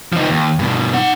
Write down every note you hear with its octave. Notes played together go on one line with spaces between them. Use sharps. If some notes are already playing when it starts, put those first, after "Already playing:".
F3 D#4
D#2
G2 B2
D#4 F#5